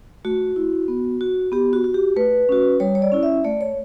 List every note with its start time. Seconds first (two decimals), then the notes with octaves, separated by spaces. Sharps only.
0.25 A3 F#4
0.56 E4
0.88 B3
1.21 F#4
1.52 B3 G4
1.73 F#4
1.84 F#4
1.94 G4
2.17 A3 B4
2.49 C#4 F#4
2.80 G3 C#5
2.95 C#5
3.02 D5
3.12 C#4 E4
3.23 E5
3.44 A3 D5
3.61 C#5